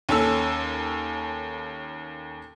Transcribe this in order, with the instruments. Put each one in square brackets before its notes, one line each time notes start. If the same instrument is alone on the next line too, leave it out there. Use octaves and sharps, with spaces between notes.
[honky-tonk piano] D#2 C#4 A4 E6